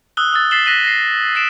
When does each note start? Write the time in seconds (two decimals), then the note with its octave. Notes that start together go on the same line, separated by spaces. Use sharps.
0.17 D#6 E6 F#6 G7
0.33 D#6 E6 F#6 A6
0.51 A6 B6 C7 E7 F#7 G7
0.66 F#6 A#6 B6 D#7 E7 F#7
0.85 A#6 C7
1.35 A6 C7 D7 E7